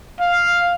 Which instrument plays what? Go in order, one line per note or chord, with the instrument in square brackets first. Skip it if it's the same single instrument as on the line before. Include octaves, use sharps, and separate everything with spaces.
[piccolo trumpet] F5